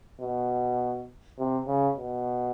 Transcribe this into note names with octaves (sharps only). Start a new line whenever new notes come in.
B2
C3
C#3
B2